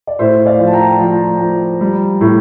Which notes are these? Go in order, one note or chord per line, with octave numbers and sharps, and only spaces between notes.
D5
A2 C5 E5
D5 F5
F3
A5
G5 A#5
F3
F3
G3
A2